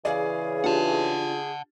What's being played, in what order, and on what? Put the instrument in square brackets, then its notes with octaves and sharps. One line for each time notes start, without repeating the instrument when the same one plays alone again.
[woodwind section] C#3 E3 [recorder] G#4 [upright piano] D5 F5
[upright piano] D4 F4 G4 [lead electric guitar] F#5 A5